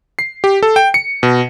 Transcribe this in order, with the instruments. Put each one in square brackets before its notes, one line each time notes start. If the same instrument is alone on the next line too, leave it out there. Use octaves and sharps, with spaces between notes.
[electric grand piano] C7
G4
A4
G5
C#7
B2